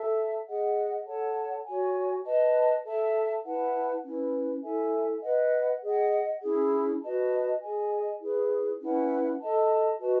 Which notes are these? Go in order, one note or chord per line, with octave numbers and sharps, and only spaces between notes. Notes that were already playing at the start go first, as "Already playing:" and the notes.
Already playing: A4 E5 A5
G#4 D#5 F#5
A4 C#5 F#5 A5
F#4 C#5 G#5
B4 D#5 A5
A4 E5 A5
E4 B4 F#5 A5
C#4 E4 B4
E4 A4 E5 G#5
B4 D#5 F#5
G#4 D#5 F#5
C#4 E4 G#4
F#4 B4 D#5 A5
G#4 D#5 G#5
E4 G#4 B4
C#4 E4 B4 F#5
A4 D#5 A5
F#4 B4 D#5 A5